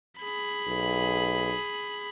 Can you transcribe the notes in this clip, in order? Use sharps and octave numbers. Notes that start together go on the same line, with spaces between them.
G#4 B5
B1